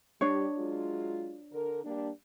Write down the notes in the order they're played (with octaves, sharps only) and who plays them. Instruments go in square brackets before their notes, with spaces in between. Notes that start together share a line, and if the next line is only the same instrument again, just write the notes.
[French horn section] G3 G4 [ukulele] D4 C#5
[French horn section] F#3 G#3 F4
D3 A#4
G3 A#3 D4